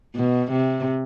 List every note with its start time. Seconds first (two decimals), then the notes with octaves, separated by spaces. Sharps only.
0.15 B2
0.52 C3